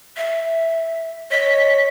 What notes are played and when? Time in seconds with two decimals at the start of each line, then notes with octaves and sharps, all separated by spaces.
0.17 E5
1.31 C#5 D#5 B6